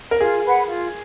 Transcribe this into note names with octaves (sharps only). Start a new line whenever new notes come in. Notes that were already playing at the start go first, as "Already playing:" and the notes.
A#4
F4 G#4
B4 F#5
F4